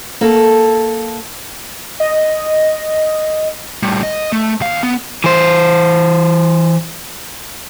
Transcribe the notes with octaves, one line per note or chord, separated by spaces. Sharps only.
A#3 A4
D#5
A2 G3
D#5
A3
D#2 F5
B3
E3 C5